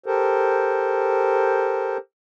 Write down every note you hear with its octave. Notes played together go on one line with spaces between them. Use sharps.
G4 A4 A#4 C5